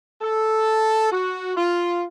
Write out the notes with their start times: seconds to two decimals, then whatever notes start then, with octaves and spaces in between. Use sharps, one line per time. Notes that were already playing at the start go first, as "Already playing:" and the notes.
0.22 A4
1.12 F#4
1.56 F4